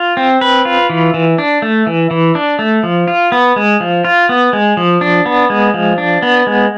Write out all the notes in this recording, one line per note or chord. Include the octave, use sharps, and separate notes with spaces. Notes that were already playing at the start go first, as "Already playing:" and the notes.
Already playing: F4
C4
B4
F4
E3
E3
D4
A3
E3
E3
D4
A3
F3
F4
B3
G#3
F3
F4
B3
G#3
F3
D4
B3
G#3
F3
D4
B3
G#3